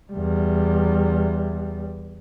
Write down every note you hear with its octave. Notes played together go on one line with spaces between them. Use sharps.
E2 G3